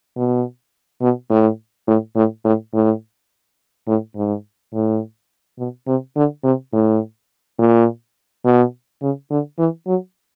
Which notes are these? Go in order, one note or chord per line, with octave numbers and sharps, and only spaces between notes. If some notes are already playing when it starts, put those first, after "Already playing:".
B2
B2
A2
A2
A2
A2
A2
A2
G#2
A2
B2
C3
D3
C3
A2
A#2
B2
C#3
D3
E3
F#3